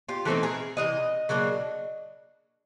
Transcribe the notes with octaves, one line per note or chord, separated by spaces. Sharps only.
F4 G4
E3 A3 C4 D#4 G4 A4
G#4 A#4
C3 E3 D#5
C#3 F#3 A#3 D4